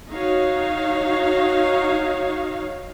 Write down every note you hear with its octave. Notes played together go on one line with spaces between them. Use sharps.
D#4 F#4 C#5 F5